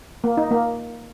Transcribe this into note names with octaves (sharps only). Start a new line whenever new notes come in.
A#3
D#4
A#3